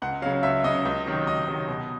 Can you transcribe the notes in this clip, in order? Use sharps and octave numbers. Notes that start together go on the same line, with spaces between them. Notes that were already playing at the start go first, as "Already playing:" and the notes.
C#2 F#5
C#3 F#3 F5
C#2 E5
C#3 F#3 D#5
C#2
C3 D#3 F#3
C#2 D#5
C3 D#3 F#3
B2